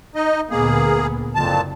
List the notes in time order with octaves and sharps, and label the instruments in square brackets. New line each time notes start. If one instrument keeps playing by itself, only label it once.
[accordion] D#4 D#5
[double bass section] D2 A#2 B3 [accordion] A#3 G#4
[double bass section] F#1 [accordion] F2 A#2 A5